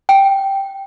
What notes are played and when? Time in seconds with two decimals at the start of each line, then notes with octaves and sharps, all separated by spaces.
0.09 G5